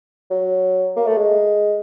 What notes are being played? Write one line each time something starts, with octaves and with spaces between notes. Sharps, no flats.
F#3
A#3
A3
G#3